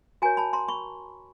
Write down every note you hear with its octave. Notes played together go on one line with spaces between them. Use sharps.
F#4 A#4 C#5 G#5 A#5
A5 B5
A#5 C6
B5 C#6